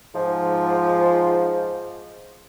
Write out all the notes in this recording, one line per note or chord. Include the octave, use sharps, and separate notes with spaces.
G#2 F3